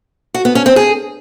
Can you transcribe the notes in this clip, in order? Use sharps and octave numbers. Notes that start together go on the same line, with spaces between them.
F#4
B3
C#4
C4
G#4